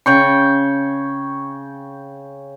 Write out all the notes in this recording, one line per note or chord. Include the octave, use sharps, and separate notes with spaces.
C#3 G5 C#6